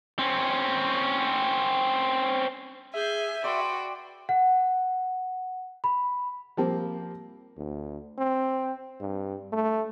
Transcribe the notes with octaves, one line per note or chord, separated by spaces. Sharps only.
C4 C#4
G#4 E5 G#5 G6
F#4 B4 D5 G5 C6
F#5
B5
F3 G3 A#3 C4 G4
D2
C4
G2
A3